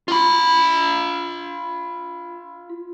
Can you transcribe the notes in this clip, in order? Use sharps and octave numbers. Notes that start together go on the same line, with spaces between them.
F4 B5